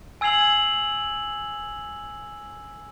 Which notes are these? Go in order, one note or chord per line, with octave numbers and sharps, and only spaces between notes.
G#5 E6 G#6 C7 F7 F#7